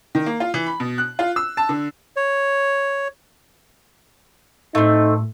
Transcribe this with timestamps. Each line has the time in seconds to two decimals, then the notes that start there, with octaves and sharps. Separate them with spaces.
0.15 D#3
0.26 A#3
0.40 F4
0.54 E3
0.66 B5
0.80 B2
0.98 F#6
1.19 F4
1.36 E6
1.57 A5
1.69 D3
2.17 C#5
4.75 A2 A3 C4 D#4